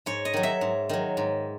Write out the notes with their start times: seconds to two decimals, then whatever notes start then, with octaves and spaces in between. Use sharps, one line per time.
0.06 G#2 C#5
0.25 D#5
0.34 D#3 F#3
0.43 E5
0.61 G#2
0.89 D#3 F#3
1.17 G#2